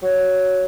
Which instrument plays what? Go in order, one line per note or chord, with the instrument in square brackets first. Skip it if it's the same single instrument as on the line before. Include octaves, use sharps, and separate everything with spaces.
[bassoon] F#3